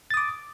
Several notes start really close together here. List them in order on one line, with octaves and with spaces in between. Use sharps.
A6 D#6 D6